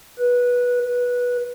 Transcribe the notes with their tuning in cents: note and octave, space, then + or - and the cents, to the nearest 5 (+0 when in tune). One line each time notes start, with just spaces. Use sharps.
B4 -15
B4 -15